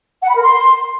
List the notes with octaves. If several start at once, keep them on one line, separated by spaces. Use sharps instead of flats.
F#5
B5
A#4
C6